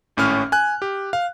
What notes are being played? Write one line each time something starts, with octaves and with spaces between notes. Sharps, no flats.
G#1 A2 C#4 F6
G#5 F#6
G4
F5